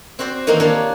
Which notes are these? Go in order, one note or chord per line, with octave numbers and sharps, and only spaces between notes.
C4 F#4 C5 D5
D#3 E3 A#3 C4 D#4 E4
A#3 D4 F4 G4 C#5